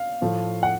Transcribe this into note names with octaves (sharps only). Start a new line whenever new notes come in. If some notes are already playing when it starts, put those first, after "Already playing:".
Already playing: F5
A2 F3 A3
F#5